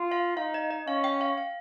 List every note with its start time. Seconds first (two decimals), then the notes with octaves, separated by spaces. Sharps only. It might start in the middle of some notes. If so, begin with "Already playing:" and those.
Already playing: F4
0.12 F5
0.36 D#4 F5
0.54 D#5
0.71 D#5
0.87 C#4 F5
1.04 G5
1.21 F5
1.38 F5